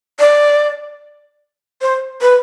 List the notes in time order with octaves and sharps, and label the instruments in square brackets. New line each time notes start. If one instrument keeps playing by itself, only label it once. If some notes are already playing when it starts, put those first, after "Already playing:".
[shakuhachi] D5
C5
B4